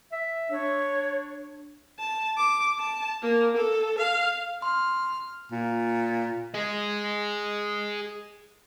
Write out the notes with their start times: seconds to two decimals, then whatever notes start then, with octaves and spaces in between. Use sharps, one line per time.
0.13 E5
0.51 D4 C#5
1.99 A5
2.37 D6
2.80 A5
3.22 A#3
3.57 A4
3.98 F5
4.62 C6 F6
5.51 A#2
6.54 G#4 D#5